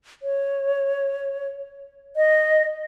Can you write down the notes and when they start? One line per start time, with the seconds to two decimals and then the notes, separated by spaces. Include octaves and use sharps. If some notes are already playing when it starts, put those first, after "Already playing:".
0.23 C#5
2.16 D#5